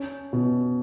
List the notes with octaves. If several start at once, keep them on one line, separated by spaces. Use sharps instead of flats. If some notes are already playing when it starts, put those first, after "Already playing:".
Already playing: C#4
B2